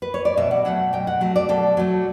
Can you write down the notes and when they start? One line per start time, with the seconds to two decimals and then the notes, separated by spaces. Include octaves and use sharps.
0.02 B4
0.14 C#5
0.25 D5
0.37 B2 E5
0.51 F#5
0.65 F#3 A3 F#5
0.93 B2 G5
1.07 F#5
1.21 F#3 A3
1.36 D5
1.49 B2 A4
1.77 F#3 A3